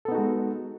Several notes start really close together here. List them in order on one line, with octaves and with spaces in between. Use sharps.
A4 B3 D#4 F#4 G#3